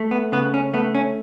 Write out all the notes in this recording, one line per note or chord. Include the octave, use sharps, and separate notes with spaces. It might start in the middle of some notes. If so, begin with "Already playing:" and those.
Already playing: A3
B3
C#3 B3
C#4
A3 B3
C#4